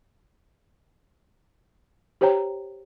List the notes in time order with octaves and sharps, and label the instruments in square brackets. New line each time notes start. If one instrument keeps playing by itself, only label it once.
[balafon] G4 C5 C#5 G5 A#5